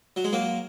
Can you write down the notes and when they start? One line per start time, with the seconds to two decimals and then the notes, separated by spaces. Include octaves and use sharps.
0.16 F#3
0.24 G#3
0.33 F#3 A#3